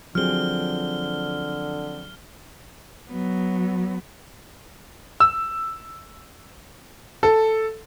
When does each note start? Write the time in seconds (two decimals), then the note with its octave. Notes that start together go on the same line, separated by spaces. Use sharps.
0.15 D3 F3 F#3 C4 G#4 F6 G7
3.09 F#3 B3
5.20 E6
7.23 A4